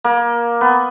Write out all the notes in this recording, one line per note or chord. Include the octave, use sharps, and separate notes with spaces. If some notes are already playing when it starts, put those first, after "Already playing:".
A#3
B3